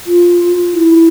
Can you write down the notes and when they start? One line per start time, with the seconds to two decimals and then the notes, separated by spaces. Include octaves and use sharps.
0.07 F4
0.73 E4